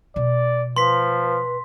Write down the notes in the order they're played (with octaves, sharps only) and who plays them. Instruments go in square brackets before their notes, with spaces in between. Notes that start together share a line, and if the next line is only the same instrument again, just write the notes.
[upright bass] B2 [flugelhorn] D5
[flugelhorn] F3 [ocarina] B4 [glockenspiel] C6 B6